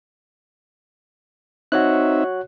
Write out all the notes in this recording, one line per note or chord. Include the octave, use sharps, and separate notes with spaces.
C4 D#4 F#4 C#5 E5 F#6